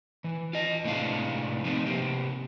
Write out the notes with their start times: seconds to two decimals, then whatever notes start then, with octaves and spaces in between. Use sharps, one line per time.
0.24 E3
0.53 F4 D#5
0.85 A2 C3 G#3 B3 D4 F5
1.64 F3 A3 C4 D#4
1.85 C3 A#3 G4